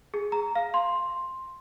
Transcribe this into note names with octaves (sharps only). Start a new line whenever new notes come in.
G#4
A#5
F5
C6